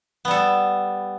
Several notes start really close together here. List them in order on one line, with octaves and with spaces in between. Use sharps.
B3 G3 A4